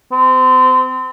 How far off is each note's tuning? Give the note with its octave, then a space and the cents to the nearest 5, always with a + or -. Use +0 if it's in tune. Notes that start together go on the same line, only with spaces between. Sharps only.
C4 -30